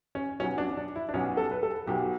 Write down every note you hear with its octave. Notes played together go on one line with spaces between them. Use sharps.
C#4
B1 B2 F#3 C#4
D4
D4
E4
D4
B1 B2 F#3 C#4
A4
B4
A4
B1 B2 F#3 G4